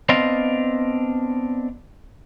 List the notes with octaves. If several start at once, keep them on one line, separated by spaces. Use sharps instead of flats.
B3 C4 D4 D#5 F5